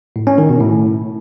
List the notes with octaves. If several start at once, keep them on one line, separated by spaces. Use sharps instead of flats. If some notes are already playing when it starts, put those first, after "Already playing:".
A2
C#4
D#3
B2
A2